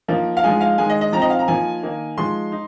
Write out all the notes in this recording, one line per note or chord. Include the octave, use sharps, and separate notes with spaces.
F3 A#3 D#4
F5
F3 G#3 D#4 G#5
F5
D#3 G#3 D#4 G#5
D#5
D#5
F3 C4 D#4 A#5
D#5
F5
A#5
F3 A#3 D#4 G#5
D#3 A#3 D#4
F3 G#3 D#4 C6
D#4